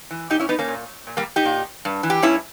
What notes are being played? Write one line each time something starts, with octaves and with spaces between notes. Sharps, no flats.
E3
A#2 D#4 G4
C#4 E4
B3 D#4
A#3 C#4
A#2
A#2
G3 A#3
D#4 G4
A#2
G2
E3
G4
G2 C#4 E4